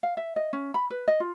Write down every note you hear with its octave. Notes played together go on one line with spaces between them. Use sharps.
F5
E5
D#5
C#4
B5
B4
D#5
F4